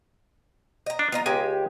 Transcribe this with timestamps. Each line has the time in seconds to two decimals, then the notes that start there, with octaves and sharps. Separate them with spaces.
0.86 D#5 A#5
0.99 D4
1.12 B3 F4 D#5 A#5
1.26 C#2 G#3 G4 G#5